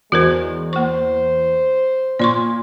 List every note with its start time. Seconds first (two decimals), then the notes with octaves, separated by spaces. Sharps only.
0.12 E2 G#3 F#4 A#4 C5
0.73 A#3 C5 C#6
2.19 A#2 D5 C6 C#6